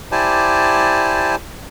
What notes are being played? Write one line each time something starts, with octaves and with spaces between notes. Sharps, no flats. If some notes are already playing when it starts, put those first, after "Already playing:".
E4 G4 C5 D5 G#5 A5